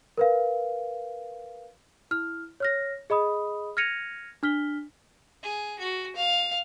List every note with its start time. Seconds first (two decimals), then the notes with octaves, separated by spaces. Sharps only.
0.18 A#4 B4 F5
2.11 E4 F6
2.60 C#5 F6 A#6
3.10 G#4 D#5 B5 D#6
3.77 F6 G#6 A#6 C#7 D#7 F7
4.43 D4 F6 B6 G7
5.43 G#4
5.79 F#4
6.16 F5